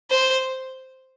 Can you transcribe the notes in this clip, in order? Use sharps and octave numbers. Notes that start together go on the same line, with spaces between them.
C5